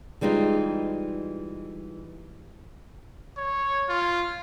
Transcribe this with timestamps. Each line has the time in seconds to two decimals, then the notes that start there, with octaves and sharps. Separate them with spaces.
0.21 E3 G3 G#3 D#4 F4
3.38 C#5
3.89 F4